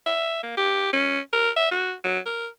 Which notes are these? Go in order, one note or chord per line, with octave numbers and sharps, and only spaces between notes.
E5
A#3
G4
C#4
A#4
E5
F#4
F#3
A#4